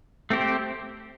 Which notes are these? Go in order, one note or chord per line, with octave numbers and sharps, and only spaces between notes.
A3 C4 G4 C5